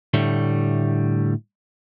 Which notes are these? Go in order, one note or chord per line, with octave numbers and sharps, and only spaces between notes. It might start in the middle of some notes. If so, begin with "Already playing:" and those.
A2 D3 G3 A3